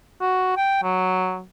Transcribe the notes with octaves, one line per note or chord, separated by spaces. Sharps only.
F#4
G5
F#3